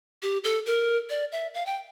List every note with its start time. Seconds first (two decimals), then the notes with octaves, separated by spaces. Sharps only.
0.22 G4
0.44 A4
0.66 A#4
1.10 D5
1.32 E5
1.54 F5
1.66 G5